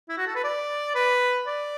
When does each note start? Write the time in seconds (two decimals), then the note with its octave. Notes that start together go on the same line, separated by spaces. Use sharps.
0.09 E4
0.17 F#4
0.27 A4
0.35 B4
0.44 D5
0.95 B4
1.47 D5